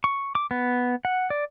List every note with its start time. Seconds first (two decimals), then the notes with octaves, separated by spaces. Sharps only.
0.04 C#6
0.35 D6
0.51 B3
1.05 F#5
1.30 D5